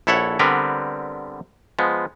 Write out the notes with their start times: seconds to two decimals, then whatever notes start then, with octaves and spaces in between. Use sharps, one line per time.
0.07 A#1 E4 A4 C#5 E5 F#5
0.39 D3 G3 B3 C4 A#4 B4
1.79 F3 G#3 B3